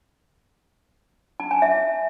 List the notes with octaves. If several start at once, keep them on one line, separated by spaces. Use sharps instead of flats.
A5
G#5
E5